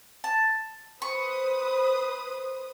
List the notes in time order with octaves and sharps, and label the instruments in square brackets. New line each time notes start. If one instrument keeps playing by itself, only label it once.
[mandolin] A5
[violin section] B4 C5 D#6 [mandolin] C#6